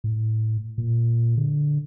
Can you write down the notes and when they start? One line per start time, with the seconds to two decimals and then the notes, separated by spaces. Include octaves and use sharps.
0.04 A2
0.78 A#2
1.37 D3